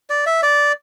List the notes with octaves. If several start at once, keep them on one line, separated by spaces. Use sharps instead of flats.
D5
E5
D5